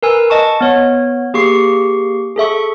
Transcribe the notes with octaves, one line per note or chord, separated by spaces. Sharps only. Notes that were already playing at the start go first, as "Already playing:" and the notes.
A#4 B4 G#5 E6
D#5 A5 C#6
B3 C#5
A#3 G4 G#4 C#6 C7
G#4 A4 E5 C#6